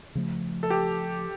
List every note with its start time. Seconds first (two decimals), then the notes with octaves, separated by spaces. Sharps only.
0.15 C#3 F3 A3
0.63 A4
0.70 G4